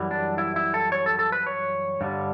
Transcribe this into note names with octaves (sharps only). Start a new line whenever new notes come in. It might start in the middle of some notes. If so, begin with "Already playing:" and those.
Already playing: F#2 E3 G3
D4
E4
E4
A4
C#5
A4
A4
B4
C#5
G2 D3 G3